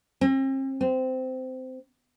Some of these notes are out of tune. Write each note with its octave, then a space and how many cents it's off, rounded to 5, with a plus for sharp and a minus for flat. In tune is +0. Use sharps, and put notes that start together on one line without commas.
C4 +40
C4 -20